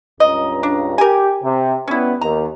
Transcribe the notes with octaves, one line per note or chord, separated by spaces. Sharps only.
C#2 G2 D#5 A#5
D4
G4 A#4 G#5
C3
G3 B3 C#4 E4
D#2 A#5